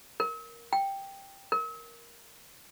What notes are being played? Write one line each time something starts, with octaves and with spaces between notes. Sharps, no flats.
A#4
G5
A#4